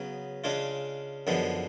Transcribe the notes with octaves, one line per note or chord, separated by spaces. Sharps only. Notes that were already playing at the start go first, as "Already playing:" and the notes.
Already playing: C#3 F#3 B3
C#3 G#3 D4 F4
F#2 D3 F3 G#3 B3